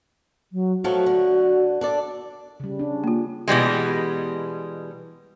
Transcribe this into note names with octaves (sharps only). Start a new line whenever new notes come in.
F#3
F3 F#3 A3 F#4
D3
D4 A4 D5
C#3 G3
C#4 D4
A#3 F4
B2 E3 G3 G#3